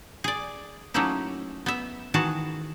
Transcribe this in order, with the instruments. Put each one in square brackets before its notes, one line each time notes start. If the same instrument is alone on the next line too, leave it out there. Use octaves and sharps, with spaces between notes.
[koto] G#4 D5
F#3 A3 A#3 C#4 D#4 E4
B3 E5
D#3 E3 F#4 G#4 A5